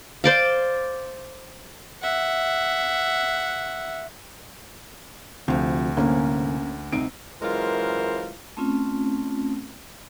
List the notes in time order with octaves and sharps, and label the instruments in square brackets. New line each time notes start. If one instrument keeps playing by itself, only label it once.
[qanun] C5 D5 F5
[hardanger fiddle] E5 F#5
[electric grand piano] D2 [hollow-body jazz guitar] C3 F3
[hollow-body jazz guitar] C2 G#2 D3 [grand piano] A#3 C#4
[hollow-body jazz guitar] C2 C4 D#4 [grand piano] D7
[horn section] F#2 E3 G#3 F4 A#4 C5
[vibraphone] A3 C4 C#4 F4